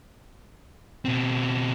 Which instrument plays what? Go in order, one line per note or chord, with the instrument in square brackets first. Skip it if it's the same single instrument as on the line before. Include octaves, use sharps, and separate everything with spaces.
[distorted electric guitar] B2 C4